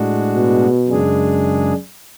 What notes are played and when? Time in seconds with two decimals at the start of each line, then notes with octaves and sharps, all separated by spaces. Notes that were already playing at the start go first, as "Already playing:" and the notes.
Already playing: A2 G#3 D4 F#4
0.35 B2
0.88 F#2 C#3 G#3 D4 G#4